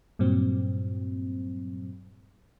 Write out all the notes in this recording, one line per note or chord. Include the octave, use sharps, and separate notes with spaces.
G2 A#2 F#3 C4